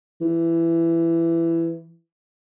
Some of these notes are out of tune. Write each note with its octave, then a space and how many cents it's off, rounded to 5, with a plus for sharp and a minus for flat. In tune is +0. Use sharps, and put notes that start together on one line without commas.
E3 +15